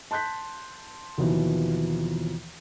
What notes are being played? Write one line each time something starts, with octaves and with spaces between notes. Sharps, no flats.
A5 C6 F#6 G6 B6
D#2 B2 E3 F3